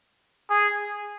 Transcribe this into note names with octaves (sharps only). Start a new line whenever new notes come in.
G#4